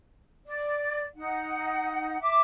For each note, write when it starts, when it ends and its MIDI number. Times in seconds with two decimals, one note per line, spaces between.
0.45 1.04 74
1.16 2.20 63
1.16 2.20 78
2.20 2.41 76
2.20 2.41 86